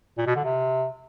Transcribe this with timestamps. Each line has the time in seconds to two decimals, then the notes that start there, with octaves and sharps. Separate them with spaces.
0.18 A#2
0.27 B2
0.35 D3
0.44 C3